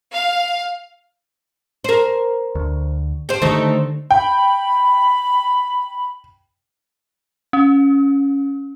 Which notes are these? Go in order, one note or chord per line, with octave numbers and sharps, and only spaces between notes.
F5
A#4 C5
D2
G4 C5
D3 D#3 A3 C4 D#4
G5 B5
C#4